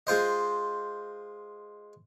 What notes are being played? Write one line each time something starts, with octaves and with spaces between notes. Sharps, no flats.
G#3 F4 C5 D#5